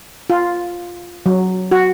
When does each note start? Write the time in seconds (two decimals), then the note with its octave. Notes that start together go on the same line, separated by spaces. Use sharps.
0.30 F4
1.26 F#3
1.71 F#4